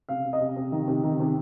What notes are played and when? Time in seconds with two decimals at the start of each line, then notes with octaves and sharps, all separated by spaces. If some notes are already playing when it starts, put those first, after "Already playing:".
0.09 C3 F5
0.25 C3
0.33 D#5
0.40 C3
0.56 C3
0.72 D#3
0.88 C3
1.04 D#3
1.20 C3